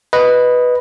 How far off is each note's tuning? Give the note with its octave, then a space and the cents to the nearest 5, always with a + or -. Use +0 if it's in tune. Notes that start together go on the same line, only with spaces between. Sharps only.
B4 +0 D#5 +0